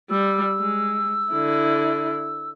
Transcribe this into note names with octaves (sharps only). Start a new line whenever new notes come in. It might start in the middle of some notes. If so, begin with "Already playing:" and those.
G3 E6
G#3
D3 E4